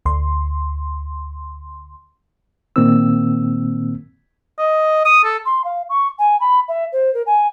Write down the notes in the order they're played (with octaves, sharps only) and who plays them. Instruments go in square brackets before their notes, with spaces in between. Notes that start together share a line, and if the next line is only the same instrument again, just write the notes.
[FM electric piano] D2 C6
[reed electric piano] A#2 D#3 A#3 C4 E6
[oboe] D#5
D#6
A4
[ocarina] C6
F5
C#6
G#5
B5
E5
C5
A#4
G#5